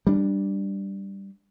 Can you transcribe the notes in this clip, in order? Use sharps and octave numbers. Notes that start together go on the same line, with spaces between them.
G3 D4